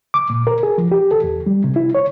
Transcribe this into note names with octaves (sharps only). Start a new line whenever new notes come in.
D6
A#2
A#4
G#4
F3
G4
A4
E2
G3
C3
E4
C#5